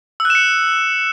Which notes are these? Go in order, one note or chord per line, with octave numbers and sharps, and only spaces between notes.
E6
F#6
E7
C#7